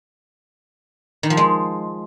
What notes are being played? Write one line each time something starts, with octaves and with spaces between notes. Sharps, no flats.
D#3
F3
G#3